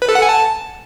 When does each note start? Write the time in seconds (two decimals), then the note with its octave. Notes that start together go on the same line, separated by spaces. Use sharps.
0.02 B4
0.09 A4
0.15 F#5
0.22 G#5
0.29 A5